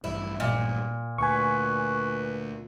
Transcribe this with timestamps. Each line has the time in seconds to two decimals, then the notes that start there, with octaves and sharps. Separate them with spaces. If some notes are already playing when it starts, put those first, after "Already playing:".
0.04 A1 G2 E4
0.40 A#2
1.18 D2 B4 G#5 C#6